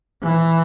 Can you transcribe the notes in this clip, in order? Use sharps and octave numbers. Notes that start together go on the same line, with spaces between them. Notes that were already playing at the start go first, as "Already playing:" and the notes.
E3